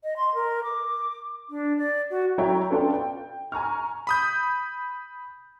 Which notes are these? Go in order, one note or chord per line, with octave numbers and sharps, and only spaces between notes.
D#5
C6
A#4
D6
D4
D5
F#4
F#3 E4 C#5 G5 A#5
B3 D4 F4 A4 D5 G5
G5
G#5 A#5 C#6 F6
B5 D#6 G6